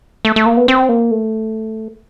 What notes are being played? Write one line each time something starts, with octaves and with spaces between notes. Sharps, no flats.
A3
A3
A#3
B3
C4
A#3
A3